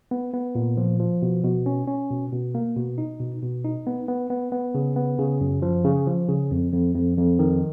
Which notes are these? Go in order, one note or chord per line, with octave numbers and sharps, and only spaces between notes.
B3
B3
A#2
F3
F3
B2
B2
C#4
C#4
B2
B2
A#3
B2
D#4
B2
B2
D#4
B3
B3
B3
B3
C#3
B3
C#3
F#2
F3
C#3
F3
C#3
F2
F2
F2
F2
D#3